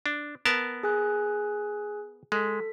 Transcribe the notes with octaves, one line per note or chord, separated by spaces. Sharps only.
D4
B3 A#4 A5
G#4 G#5 F#6
G#3 A4 B6